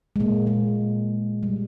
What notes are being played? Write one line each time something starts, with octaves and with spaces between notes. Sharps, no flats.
G#3
A#2 A#3
G#3
G3